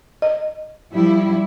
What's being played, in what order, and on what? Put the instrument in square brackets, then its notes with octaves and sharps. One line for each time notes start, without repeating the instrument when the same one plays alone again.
[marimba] D#5
[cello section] F3 G3 E4